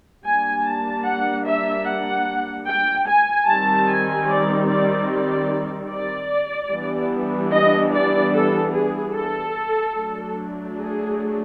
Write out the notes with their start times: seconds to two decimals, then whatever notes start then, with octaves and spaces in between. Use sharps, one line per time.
0.25 G3 A#3 D4 G#5
0.66 A5
1.06 F#5
1.46 E5
1.87 F#5
2.68 G5
3.08 G#5
3.48 D#3 G3 C4 A5
3.88 G#5
4.29 D5
4.69 D5
5.10 D5
5.91 D5
6.71 E3 G3 B3 D4
7.53 D#5
7.93 D5
8.34 A4
8.74 G#4
9.14 A4
9.95 F#3 A3 D4
10.76 G#4